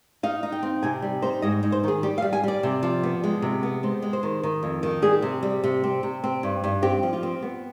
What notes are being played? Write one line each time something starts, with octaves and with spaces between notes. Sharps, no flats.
D#4 F5
D#4
G5
C4
C3 G#5
G3
D#4 C5
G#2 D#5
G#2
C5
D#3 G#4
G3 G4
F5
G3
G#5
G3 D5
C3
F3
B3
G#3
C3
B3
G#3 C5
G#3
C5
D#3
D#3
F2
D#3
G3 G#4
C3
G3
C3
C4
C3
C4
G2
G2
C4 G4
F3
F4
C4
B3